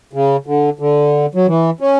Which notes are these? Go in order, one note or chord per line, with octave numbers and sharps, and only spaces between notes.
C#3
D3
D3
F#3
E3
C#4